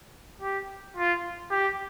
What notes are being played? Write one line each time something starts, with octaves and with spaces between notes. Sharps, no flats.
G4
F4
G4